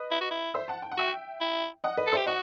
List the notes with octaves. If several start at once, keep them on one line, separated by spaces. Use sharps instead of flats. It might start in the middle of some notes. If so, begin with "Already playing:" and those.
Already playing: B4 D#5
E4
F#4
E4
C5 E5
F#5 A5
G5
F#5
F#4 E5 G5
E4
D#5 F#5
B4 D#5
A4
G4 C5 E5
F#4 D#5 F#5